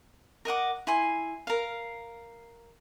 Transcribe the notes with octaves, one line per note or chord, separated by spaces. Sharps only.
A#4 D#5 F#5 D6
E4 G#5 C6
A#4 F5